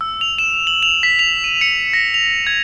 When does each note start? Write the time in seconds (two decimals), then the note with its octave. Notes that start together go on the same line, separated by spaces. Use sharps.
0.01 E6
0.21 F7
0.38 E7
0.67 F#7
0.83 F7
1.03 B6
1.19 F7
1.44 D#7
1.61 C#7
1.93 A#6
2.14 F7
2.47 G#6